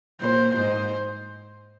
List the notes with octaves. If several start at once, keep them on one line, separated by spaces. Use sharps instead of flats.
A#2 C5
G#2 C5